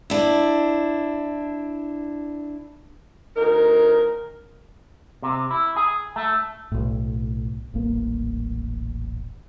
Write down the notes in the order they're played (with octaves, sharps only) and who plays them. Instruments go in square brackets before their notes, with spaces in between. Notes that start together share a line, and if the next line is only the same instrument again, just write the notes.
[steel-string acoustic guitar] D4 E4
[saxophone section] D2 D#4 A#4
[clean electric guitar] C3
E4
G#4
A3
[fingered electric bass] B1 A2
D#1 A1 A#3